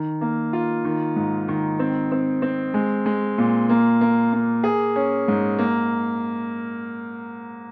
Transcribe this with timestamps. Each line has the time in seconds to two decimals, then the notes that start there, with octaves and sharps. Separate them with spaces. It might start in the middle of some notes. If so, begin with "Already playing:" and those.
Already playing: D#3
0.21 A#3
0.53 F4
0.85 D#3
1.16 G#2
1.48 D#3
1.79 C4
2.12 C4
2.42 C4
2.74 G#3
3.06 G#3
3.38 A#2
3.69 A#3
4.01 A#3
4.33 A#3
4.64 G#4
4.96 C#4
5.28 G#2
5.59 A#3